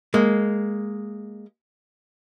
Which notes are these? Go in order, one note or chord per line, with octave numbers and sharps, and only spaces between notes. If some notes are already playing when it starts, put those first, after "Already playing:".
G#3 A#3